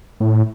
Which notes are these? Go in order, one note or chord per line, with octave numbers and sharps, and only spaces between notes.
A2